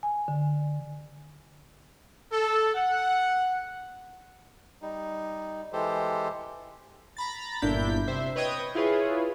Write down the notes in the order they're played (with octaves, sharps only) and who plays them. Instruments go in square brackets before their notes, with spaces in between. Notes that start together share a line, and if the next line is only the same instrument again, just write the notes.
[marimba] G#5
D3
[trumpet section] A4
F#5
[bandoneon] G3 D#4
E3 G#3 G4 A4 C5
[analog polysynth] A#5 B5 A6
G1 A#2 D4 E4 G6 B6
C3 C5 E5
B4 C#5 D#5 G5 D#6 G#6
E4 F4 G#4 B4 C#5